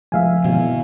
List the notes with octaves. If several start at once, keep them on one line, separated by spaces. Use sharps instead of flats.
F1 C#2 C#3 F3 E5 F5 G#5
G#1 E2 B2